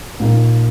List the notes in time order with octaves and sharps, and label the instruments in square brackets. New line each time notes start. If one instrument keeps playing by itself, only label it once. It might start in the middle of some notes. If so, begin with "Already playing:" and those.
[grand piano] A#2 A#3 D#4